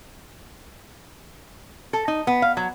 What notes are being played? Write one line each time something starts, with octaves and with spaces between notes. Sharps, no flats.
A4
D#4
B3
F5
F#3